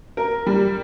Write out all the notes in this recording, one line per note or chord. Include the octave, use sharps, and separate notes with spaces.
A#4
G3